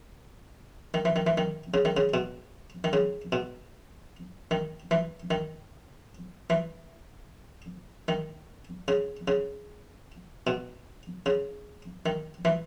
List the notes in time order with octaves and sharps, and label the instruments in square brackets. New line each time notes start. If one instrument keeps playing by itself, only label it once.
[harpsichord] D#3
E3
D#3
E3
D#3
C#3
D#3
C#3
B2
D#3
C#3
B2
D#3
E3
D#3
E3
D#3
C#3
C#3
B2
C#3
D#3
E3